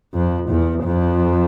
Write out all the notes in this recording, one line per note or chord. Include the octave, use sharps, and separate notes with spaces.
F2
E2
F2